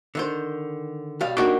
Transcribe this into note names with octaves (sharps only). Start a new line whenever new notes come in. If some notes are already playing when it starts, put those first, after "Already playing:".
D3 D#3 C5
B1 G3 F5
A#3 D4 D#4 F#4 G4 A#4